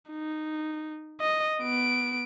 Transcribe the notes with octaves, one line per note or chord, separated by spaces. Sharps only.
D#4
D#5
B3 D7